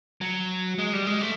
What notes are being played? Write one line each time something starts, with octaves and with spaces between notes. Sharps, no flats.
F#3
G#3
G3
G#3
A3